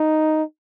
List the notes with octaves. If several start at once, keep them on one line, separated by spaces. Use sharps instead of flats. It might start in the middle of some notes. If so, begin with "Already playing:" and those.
Already playing: D#4